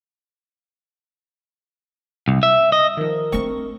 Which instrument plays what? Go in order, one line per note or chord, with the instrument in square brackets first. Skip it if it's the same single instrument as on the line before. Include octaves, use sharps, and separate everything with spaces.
[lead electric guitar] C2
E5
D#5
[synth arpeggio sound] D#3 F3 [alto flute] A#4
[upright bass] A3 D4 [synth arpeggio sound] C4 C#6